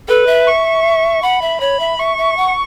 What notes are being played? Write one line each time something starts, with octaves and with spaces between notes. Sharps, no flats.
A4 B4
E5
C#6
F#5 B5
E5
C#5 B5
E5
E5 C#6
E5
F#5